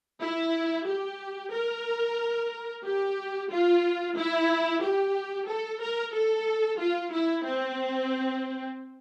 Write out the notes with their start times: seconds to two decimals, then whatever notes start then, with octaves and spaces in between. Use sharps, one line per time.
0.21 E4
0.86 G4
1.52 A#4
2.83 G4
3.50 F4
4.15 E4
4.82 G4
5.46 A4
5.80 A#4
6.13 A4
6.78 F4
7.11 E4
7.44 C4